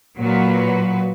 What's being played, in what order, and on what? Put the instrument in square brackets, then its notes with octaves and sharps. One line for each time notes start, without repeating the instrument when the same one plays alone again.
[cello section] A#2 F#3 F#4 B4